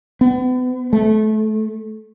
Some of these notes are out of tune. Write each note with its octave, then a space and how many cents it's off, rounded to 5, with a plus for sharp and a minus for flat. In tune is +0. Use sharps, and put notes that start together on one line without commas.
B3 +35
A3 -25